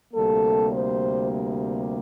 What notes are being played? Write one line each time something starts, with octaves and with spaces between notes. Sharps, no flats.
D2 C3 G3 A#3 A4
C5